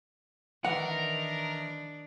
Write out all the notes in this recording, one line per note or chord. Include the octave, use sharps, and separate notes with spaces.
D#3 E3 D4 A#4 F#5